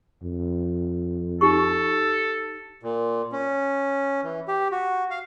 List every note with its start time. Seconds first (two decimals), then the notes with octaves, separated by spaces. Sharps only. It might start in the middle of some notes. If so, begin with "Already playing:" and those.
0.22 F2
1.41 D#4 G4 A4 C#6
2.83 A#2
3.32 C#4
4.24 E3
4.48 G4
4.72 F#4
5.11 F5